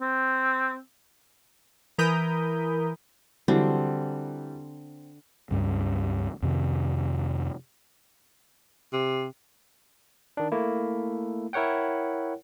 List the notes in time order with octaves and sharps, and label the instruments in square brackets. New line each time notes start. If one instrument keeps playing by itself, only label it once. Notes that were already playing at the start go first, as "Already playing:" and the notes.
[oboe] C4
[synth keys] E3 A#4 B5 D#6 G6
[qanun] D3 C4 [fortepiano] E3 F#3 G3
[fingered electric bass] C#2 G2 C#4
F2 C3 D#3
[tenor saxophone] C3
[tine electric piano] D#3 D4
A3 A#3 E4
E4 A#4 C#5 F#5 G5